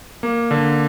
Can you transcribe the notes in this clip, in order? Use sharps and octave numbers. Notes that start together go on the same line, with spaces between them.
A#3
D3